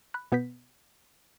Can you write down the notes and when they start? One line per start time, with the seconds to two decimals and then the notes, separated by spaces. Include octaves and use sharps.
0.14 B5 F#6
0.32 B2 B3 B4 G6 B6